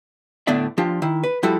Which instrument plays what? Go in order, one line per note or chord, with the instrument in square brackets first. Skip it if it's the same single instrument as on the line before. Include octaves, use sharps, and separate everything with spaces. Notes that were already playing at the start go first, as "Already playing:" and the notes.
[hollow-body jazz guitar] A2 D3 B3 D4 D5 E5
F3 D4 F4 G4
D#3 E4
B4
F3 G3 E4 F#4 A4